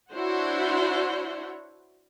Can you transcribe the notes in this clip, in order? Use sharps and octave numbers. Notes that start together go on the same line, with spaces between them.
D4 E4 F#4 C5 C#5 F#5